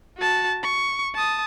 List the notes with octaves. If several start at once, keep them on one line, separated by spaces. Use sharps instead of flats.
F#4 A5
C#6
A5 D#6